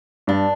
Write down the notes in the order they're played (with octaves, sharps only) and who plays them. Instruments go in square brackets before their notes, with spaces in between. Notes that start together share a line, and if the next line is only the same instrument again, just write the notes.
[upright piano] G2 [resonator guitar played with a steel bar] D4